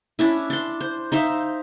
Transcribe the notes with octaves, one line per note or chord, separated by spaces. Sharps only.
C#4 D4 E4
D4 C6
C5
D#4 C5 E5 F5